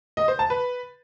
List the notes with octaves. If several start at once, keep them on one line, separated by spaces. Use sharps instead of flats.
D#5
C5
A5
B4